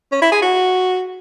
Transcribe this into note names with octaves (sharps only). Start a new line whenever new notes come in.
C#4
E4
G#4
F#4